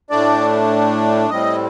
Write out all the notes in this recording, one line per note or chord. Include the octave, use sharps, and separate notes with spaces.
A2 A3 D4 D5
A2 G3 C4 D#5